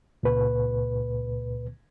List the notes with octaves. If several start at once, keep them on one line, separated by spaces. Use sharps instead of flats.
C#2 A#2 B4